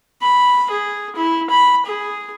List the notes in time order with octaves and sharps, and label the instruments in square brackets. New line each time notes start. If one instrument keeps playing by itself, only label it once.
[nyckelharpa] B5
G#4
E4
B5
G#4